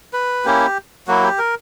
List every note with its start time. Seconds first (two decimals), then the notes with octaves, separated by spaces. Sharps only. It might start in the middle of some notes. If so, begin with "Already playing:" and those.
0.13 B4
0.45 A#3 C#4 E4 G4
1.07 F#3 A#3 E4 F#4
1.23 G4
1.38 A#4